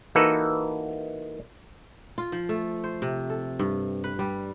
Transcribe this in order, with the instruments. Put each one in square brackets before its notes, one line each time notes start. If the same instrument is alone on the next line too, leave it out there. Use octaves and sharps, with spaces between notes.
[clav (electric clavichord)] E3 A#3 D#4 F#4 A4 B4
[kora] F4
F3
A3
C5
C3
A4
G2
B4
G3